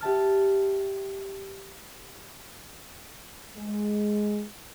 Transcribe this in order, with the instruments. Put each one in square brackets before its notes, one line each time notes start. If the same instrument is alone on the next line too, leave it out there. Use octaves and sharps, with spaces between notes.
[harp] G4 E5 A5 F6
[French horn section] G#3